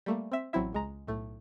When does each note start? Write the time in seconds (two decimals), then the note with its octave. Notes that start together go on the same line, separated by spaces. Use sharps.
0.06 G3 A3 A#3
0.32 C4 E5
0.53 A1 F#3 C4 E4 E5
0.73 C#2 G#3 A#5
1.07 B1 A2 A3